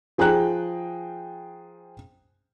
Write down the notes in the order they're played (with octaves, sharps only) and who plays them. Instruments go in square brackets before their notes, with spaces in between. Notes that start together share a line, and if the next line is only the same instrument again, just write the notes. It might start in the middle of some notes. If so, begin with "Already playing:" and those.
[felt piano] F3 G#4 G5 A#5 F#6